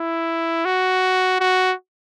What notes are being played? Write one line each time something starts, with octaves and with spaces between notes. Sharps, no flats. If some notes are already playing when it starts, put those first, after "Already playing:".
Already playing: E4
F#4
F#4